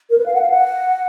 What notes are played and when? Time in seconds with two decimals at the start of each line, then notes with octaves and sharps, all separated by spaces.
0.10 A#4
0.18 B4
0.26 F5
0.34 F#5
0.42 F5
0.50 F#5